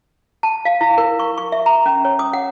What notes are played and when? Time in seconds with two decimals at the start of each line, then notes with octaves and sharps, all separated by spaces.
0.43 A5
0.65 F5
0.81 E4
0.98 A#4
1.19 C#6
1.38 C#6
1.52 E5
1.66 A#5
1.86 C#4
2.05 C#5
2.19 D#6
2.33 F#5